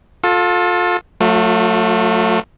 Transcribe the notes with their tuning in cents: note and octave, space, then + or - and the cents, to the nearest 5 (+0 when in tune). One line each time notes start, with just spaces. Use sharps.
F4 +30 A4 +0
F#3 -25 A3 +15 F4 +40